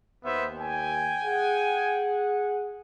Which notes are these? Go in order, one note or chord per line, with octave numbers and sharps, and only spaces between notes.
D#2 B3 C5 E5
G5 G#5
G#4 F#5